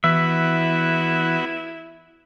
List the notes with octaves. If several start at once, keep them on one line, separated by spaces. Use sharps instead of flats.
E3 B3 E4 F#4 B4 E5